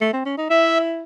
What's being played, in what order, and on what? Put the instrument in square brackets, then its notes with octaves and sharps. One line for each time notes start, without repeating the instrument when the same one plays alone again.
[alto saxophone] A3
C4
C#4
D#4
[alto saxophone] E4 [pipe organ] E5